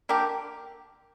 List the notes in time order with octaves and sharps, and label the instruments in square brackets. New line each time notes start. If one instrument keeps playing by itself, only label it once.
[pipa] D3 A#3 G4